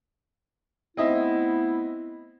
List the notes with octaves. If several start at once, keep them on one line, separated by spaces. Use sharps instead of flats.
A3 B3 C4 E4 D#5 E5